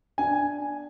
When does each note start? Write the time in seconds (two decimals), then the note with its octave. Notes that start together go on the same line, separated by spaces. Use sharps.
0.18 D4 G#5